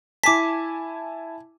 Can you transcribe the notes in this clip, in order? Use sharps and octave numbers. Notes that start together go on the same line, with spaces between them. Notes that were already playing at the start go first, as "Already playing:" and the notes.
E4 G#5 A5 D6 B6